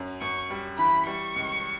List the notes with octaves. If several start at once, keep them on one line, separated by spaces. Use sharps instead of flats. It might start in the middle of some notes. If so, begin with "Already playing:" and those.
Already playing: F#2 C#4
F#2 C#6
G3
E3 B5
G3 C#6
C#2